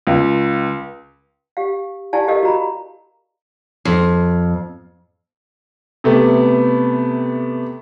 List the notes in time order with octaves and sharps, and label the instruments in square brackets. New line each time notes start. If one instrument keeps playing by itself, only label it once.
[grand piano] C#2
[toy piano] G4 F5
E4 G4 D5 F5 G#5 A5
G4 A4 A#4 D#5 F5
F#4 A#5 B5
[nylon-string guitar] F2
[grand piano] C3 A3 B3 G4 B4